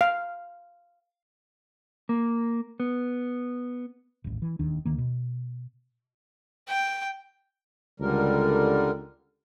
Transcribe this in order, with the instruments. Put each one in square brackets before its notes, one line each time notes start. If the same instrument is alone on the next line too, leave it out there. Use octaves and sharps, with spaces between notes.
[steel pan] F5
[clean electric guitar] A#3
B3
[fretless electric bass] D#1 A1
E3
E1 D#2 D#3 D4
D2 D#3 A#3
B2
[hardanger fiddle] G5
[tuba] C#2 [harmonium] D3 G3 A#4